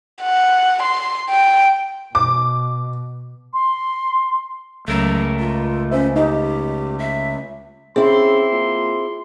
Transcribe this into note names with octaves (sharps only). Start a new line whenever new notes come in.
F#5
C6
G5
B2 D6
C6
C#2 F#3 A3 A#4
F4
C#4 C5 E5
D#4 G4
E5
C#3 C4 E4 G#4 C6
A#2